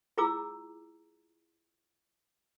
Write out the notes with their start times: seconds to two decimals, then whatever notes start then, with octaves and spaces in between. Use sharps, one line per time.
0.18 E4 F4 G#4 A#5 D6 E6